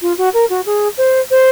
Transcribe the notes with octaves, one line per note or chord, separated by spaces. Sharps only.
F4
F#4
A#4
F#4
G#4
C5
C5